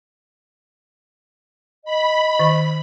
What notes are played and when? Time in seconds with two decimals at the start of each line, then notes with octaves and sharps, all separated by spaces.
1.85 D#5 B5
2.39 D#3